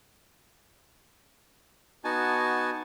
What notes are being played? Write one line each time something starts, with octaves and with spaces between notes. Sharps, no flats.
B3 D#4 F#4 G#5 A5